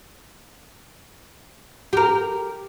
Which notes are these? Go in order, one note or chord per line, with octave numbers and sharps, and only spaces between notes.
G4 A#4